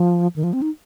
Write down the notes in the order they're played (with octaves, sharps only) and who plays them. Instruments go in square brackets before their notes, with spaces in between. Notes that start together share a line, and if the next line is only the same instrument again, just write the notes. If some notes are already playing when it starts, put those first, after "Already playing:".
Already playing: [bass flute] F3
D#3
F3
C4
D#4